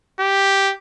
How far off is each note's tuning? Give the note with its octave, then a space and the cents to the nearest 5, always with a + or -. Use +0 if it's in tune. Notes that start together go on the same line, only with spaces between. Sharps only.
G4 +0